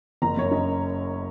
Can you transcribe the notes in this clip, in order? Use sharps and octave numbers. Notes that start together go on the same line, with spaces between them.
F#1 A#5
F#2 C#5
C#4 D#5